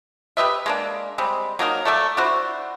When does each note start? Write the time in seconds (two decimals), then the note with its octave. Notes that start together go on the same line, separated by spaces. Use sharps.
0.37 G4 B4 D#5 E5
0.66 G#3 A#3 D4
1.18 G3 G#3 C4
1.59 F#3 A#3 D#4 A#4
1.85 A3 A4 D5 E5
2.17 D4 E4 F#4 C5